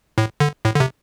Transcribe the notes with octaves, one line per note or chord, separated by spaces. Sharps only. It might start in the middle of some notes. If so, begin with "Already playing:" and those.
A2
D3
A2
D3
C3